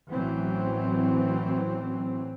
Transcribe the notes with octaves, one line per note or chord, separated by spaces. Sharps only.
A1 E3 F#3 C4